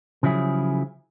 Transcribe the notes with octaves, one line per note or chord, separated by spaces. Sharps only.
C#3 F3 F#3 E4 G#4